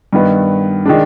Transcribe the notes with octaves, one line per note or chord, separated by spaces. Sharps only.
G2 D#3 B3
D#3 G#3 D4